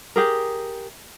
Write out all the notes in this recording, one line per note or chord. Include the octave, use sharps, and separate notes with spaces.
G4 G#4 A#4